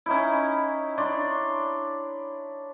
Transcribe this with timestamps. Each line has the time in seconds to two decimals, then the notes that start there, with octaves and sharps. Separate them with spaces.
0.06 C#4 D#4 E4
0.98 D4 C#5 C6 C#6